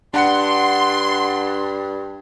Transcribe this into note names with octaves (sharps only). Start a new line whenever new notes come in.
G2 D4 F#5 C6 C#7